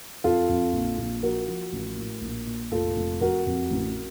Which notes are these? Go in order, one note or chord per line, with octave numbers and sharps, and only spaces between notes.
F2 F4 A4
F2
A#1
A#1
F3 F#4 A#4
F3
A1
A2
A#1
A#2
F1 F4 A4
F1
F2 F#4 A#4
F2
A1